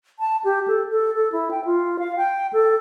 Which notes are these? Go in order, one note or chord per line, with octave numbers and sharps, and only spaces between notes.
A5
G4
A4
A4
A4
E4
G5
F4
F5
G5
A4